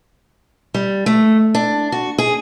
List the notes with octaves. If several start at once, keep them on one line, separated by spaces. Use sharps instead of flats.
G3
A3
D4
F#4
G#4